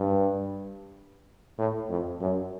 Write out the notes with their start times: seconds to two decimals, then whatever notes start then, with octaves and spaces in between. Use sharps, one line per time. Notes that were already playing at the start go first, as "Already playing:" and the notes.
Already playing: G2
1.58 A2
1.90 F2
2.21 F#2